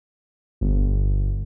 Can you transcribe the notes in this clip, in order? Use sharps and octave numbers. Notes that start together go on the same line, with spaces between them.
G1